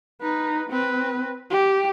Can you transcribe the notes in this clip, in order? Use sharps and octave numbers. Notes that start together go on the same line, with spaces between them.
D#4 B4
C4 B4
G4